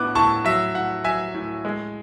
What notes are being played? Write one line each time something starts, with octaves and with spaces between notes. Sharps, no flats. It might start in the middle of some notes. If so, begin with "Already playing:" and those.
Already playing: A2 B3 D6 F#6
A2 A5 C#6
F#3 E5
A2 F#5
F#3 E5 G#5
A2
G#3